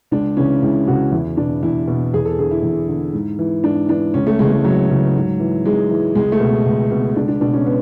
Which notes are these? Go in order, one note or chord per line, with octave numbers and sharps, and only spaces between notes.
C#2 D4
C#3 E3 C#4
C#2 E4
C#3 E3 F#4
E2 E4
B2 D4
E2 E4
B2
E2 G#4
A4
D3 G#4
E4
E2
D3
G#2
E3
G#2 D4
E3 D4
C#2 C#4
A3
C#3 E3 G#3
G#3
C#2 F#3
C#3 E3
G#2
E3
G#2 G#3
E3
C#2 G#3
A3
B2
C#2
B2
C#2 D4
D4
B2 D4
C#4
B3